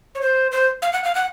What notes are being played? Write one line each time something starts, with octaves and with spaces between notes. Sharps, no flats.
C#5
C5
C5
F5
F#5
F5
F#5